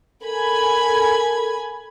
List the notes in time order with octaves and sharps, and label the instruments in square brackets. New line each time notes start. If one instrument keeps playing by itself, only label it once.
[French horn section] A4 A#4 [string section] G#5 B5 G#6